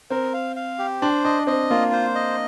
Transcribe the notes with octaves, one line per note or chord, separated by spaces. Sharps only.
C4 A#4
F5
F5
G4
D4 C5
D4 D#5
C4 D#5
A#3 F4
C5
D#5